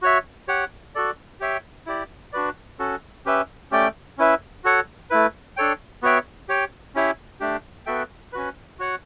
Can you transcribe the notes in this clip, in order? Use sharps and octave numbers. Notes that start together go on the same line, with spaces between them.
F#4 C#5 E5
G4 C#5 F#5
F#4 A4 D5
G4 C#5 E5 G5
E4 G4 D5
D4 F#4 B4 D5
C#4 F#4 A4
C#4 G4 B4 E5
A3 C#4 G4 D5 G5
C#4 E4 B4 E5
F#4 A4 C#5 F#5
A3 E4 B4
D4 A4 C#5 G5
B3 F#4 C#5 E5 G5
G4 C#5 G5
C#4 E4 G4 C#5 E5
A3 D4 G4
B3 F#4 A4 E5 G5
C#4 F#4 B4
F#4 C#5 F#5